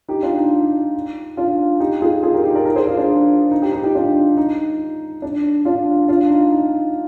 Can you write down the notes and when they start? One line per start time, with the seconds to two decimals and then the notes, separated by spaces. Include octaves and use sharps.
0.08 D#4 G4
0.23 D4 F4
0.37 D#4
1.37 D4 F4
1.80 D#4 G4
2.01 F4 G#4
2.23 F4 G#4
2.34 G4 A#4
2.44 D#4 G4
2.55 A#4 D5
2.65 A#4 D5
2.76 G#4 C5
2.87 F4 G#4
2.97 D4 F4
3.52 D#4
3.62 D#4 G4
3.73 D#4 G4
3.83 D#4 G4
3.95 D4 F4
4.37 D#4
5.22 D4
5.65 D4 F4
6.08 D4 F4
6.31 D#4
6.51 D#4